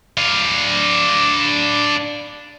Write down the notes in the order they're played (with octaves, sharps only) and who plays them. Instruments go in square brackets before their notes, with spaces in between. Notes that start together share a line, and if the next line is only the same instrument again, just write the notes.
[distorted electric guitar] D4 F5